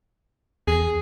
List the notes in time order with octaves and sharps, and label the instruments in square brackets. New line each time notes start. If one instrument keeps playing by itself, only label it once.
[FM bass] E2 [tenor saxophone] G#4